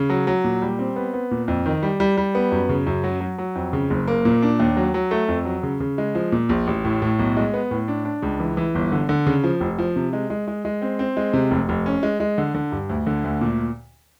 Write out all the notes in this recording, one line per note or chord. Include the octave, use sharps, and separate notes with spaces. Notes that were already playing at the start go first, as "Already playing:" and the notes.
Already playing: C#3
F#3
F#3
A#2
G3
C4
B3
B3
A#2
F2
D#3
G3
G3
G3
B3
F#2
C#3
F#2
F#3
F#3
F#3
F2
C#3
F#1
A#3
A#2
D4
D#2
F#3
F#3
A3
F2
F#3
C#3
C#3
G#3
F3
A#2
A#1
A1
A2
A2
B1
G#3
B3
A2
D4
D4
C#2
E3
E3
G1
D3
D3
C#3
F3
F1
F3
C3
G#3
G#3
G#3
G#3
C4
C4
G#3
C3
F1
F1
C#4
G#3
G#3
D3
D3
G2
D2
D3
D2
A#2